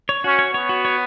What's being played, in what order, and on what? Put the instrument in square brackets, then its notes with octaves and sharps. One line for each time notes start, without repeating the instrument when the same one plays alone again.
[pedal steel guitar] C#5
[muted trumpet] C#4 [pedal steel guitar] F#4
[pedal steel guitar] C#5
[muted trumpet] B3 [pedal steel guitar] C#5
[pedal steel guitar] F#4
C#5